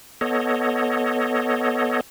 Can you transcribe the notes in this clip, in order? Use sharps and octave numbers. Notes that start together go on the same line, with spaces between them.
B3 A4 C#5 D#5